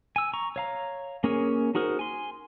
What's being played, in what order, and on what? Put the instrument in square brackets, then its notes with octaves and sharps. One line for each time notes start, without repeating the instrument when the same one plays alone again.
[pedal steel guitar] G#5 E6
A#5 C#6
C#5 F5 A#5
A#3 C#4 G#4 A#4 C#5
D#4 F#4 G#4 A#4 C5
G#5 C6